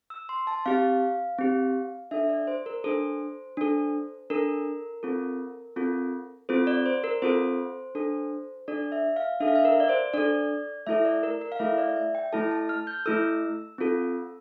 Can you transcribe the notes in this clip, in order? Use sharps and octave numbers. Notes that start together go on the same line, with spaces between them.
E6
C6
A5
C4 G4 F5
C4 G4
D4 A4 E5
D5
C5
A#4
D4 A4 C5
D4 A4
D4 A4 A#4
C4 F4 A4
C4 F4 A4
C4 F4 A4 C5
D5
C5
A#4
C4 F4 A4 C5
D4 A4
D4 A4 D5
E5
F5
D4 A4 E5
F5
E5
A#4
D5
C5
D4 A4 D5
A3 E4 A4 E5
D5
A#4
A#4
F5
A3 E4 A4 E5
D5
E5
G5
A3 E4 A4 A5
A5
F6
G6
A3 E4 A4 E6
C4 F4 A4